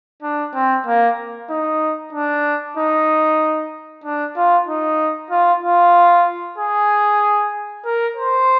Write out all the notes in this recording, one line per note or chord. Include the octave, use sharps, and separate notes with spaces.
D4
C4
A#3
D#4
D4
D#4
D4
F4
D#4
F4
F4
G#4
A#4
C5